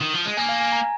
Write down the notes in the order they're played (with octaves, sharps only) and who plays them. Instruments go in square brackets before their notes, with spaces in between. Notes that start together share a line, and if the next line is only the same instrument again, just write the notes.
[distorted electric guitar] D#3
F3
G#3
[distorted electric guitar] A#3 [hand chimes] G#5
[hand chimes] F5
G#5
A#5